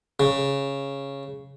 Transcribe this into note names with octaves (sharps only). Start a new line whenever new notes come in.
C#3